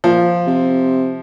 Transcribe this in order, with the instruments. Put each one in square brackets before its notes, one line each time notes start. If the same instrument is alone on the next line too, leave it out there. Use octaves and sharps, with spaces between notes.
[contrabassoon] A#2 [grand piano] F3
[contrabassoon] C3